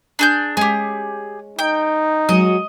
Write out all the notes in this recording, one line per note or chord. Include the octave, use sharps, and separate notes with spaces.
D4 G#4 G6
G#3 C#4 G4 G#4
D#4 G5
F#3 G#3 F#4 D#5